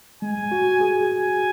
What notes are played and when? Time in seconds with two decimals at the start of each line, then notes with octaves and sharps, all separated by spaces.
0.22 G#3 G#5
0.52 F#4
0.81 G#4
1.10 G#5